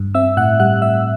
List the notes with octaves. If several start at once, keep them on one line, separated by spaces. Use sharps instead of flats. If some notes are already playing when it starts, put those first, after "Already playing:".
Already playing: G2
C4 E5 E6
A2 F#5 F#6
G3 F#5 F#6
A2 E5 E6